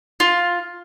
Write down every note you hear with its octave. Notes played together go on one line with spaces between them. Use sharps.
F4